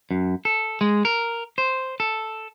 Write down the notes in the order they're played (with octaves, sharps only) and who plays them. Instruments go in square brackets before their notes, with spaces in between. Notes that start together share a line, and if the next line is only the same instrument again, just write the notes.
[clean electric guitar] F#2
A4
G#3
A#4
C5
A4